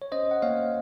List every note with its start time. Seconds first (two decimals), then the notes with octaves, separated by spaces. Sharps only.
0.02 C#5
0.12 C#4 C5 D#5
0.31 F#5
0.42 A#3 C#5 F5